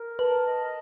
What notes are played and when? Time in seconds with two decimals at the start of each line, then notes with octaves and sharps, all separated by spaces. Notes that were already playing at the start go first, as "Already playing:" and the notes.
Already playing: A#4
0.19 B4 A5
0.44 D#5